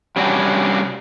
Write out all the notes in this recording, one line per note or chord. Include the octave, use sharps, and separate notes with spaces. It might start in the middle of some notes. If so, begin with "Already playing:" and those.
C3 G3 C#4 D4 F#4